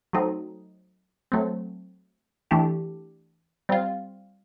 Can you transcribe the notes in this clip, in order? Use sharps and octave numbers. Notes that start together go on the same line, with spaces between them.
F#3 A3 C4 D#4
F#3 A3 C4
E3 A3 D4 G4
G3 C4 F4